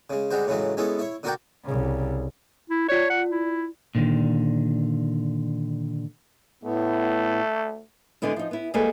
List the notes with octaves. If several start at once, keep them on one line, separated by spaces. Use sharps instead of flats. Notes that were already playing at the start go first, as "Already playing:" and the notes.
C#3 G#3
D3 G3 G#3 F#4 C5
A2 C#3 E3 F#3 G#3
G#3 B3 C#4 E4 A4
E4 C#5
D3 D4 F#4 A#4 D5 G5
C2 C#3
E4
F4 C#5 D5
F#5
E4
A#2 D3 D#3
A2 A3 B3
D3 G#3 B3 E4
F3 D#4
B3 E4
G3 G#3 A#3 G#4 A4 B4